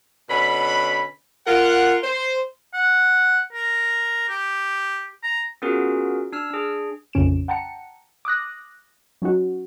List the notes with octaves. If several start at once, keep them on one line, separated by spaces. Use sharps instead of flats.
B2 D3 C#4 B5
F4 A#4 F#5
C5
F#5
A#4
G4
A#5
B3 C#4 F4 F#4 G#4 A#4
D4 E6 F6
D4 G#4
A#1 F2 C#3 C#4 D7 E7
F#5 G5 A5 A#5 C#7
D6 D#6 F#6 A#6
F#3 C#4 D#4 F#4